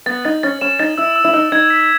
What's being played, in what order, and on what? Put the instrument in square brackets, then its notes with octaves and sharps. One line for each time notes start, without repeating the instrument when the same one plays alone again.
[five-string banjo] B3 [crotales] A6
[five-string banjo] D#4 [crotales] A6
[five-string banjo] C#4 [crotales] A6
[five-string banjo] C#4 [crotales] E7
[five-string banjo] D#4 [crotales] A6
[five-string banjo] E4 [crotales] E6
[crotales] E6
[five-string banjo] E4
[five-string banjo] D#4 [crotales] E6
[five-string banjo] D#4 [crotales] G#6
[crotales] B6